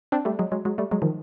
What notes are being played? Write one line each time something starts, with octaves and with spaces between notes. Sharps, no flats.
C4 D4
G3 A3
F#3 G#3
F#3 G#3
F#3 G#3
G3 A3
F#3 G#3
D#3 F3